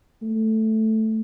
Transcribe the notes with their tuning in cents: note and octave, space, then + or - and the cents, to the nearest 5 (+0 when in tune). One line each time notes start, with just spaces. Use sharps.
A3 +0